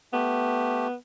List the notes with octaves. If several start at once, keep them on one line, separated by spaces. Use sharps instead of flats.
A3 B3 G4